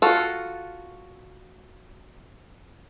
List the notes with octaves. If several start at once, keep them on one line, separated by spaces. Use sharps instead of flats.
F4 F#4 A4